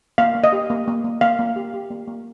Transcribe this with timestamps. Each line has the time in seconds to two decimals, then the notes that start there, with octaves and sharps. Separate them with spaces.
0.18 A#3 F5
0.35 A#3
0.44 D#5
0.52 G4
0.70 A#3
0.88 A#3
1.04 A#3
1.21 A#3 F5
1.39 A#3
1.56 G4
1.74 G4
1.90 A#3
2.07 A#3